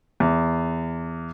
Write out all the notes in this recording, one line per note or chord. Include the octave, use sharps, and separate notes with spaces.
E2